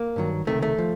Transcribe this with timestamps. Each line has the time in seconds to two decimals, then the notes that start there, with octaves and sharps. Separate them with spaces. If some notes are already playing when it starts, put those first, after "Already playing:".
Already playing: A#3
0.16 G2 D#3 F#3
0.47 C#2 C3 D#3 A3
0.63 A3
0.78 F3